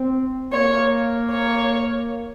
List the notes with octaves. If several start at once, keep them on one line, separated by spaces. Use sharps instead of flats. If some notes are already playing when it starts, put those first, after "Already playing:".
Already playing: C4
A#3 C#5
C#5